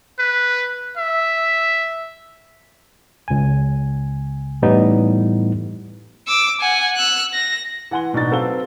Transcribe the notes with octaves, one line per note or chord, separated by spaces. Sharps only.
B4
E5
C#2 G#5
A2 E3 G3 B3 D#4
D6 E6
F#5 G#5
E6 F#6
A#6
E3 F#5 G#5 C6 G7
D1 B2 D4 D#4 A6
F#3 C4 A4 B4 F5 G7